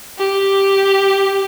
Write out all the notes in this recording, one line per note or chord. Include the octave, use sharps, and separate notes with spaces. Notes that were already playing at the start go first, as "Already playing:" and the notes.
G4